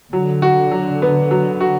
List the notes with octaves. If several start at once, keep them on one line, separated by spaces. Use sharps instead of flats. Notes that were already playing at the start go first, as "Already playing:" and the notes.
D3 F#3
F#4
F#3
B3
F#3
F#4